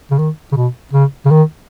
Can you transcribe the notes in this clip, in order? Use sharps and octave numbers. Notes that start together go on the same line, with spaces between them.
C#3
D#3
C#3
B2
C#3
C#3
D#3